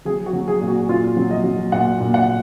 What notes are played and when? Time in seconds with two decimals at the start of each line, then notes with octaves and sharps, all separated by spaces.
0.05 F#3 G#4
0.26 F#4
0.33 F#3
0.48 G#4
0.61 A#2
0.68 F#4
0.89 A#2 F4
1.17 F#3
1.31 D#5
1.44 F#3
1.72 A#2 F#5
2.00 A#2
2.14 F#5